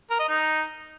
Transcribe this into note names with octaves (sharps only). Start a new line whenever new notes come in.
A#4
D#5
D#4